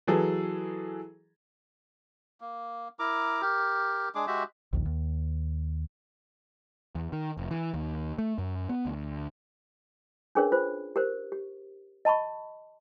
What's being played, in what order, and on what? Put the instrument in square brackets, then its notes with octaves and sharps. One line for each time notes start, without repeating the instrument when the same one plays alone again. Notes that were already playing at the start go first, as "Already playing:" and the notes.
[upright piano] E3 F#3 G#4 A4
[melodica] A#3
E4 A#4 A#5 D6
G4 A#4
G#3 D4 G#4 D6
G#3 F#4 G4 E5
[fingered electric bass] A#1 D#2 D#3
D#2
[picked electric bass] E2
D#3
F1
E3
D#2
A3
F#2
B3
D2
[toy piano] C#4 D4 G#4 A#4 B4 C#5
F4 B4 C5
G4 A#4 C5
G4
D#5 A5 B5 C#6